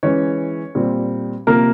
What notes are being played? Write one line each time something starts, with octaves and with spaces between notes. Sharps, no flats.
E3 G#3 C#4 C#5
A#2 G3 C4
C3 F3 A#3 A#4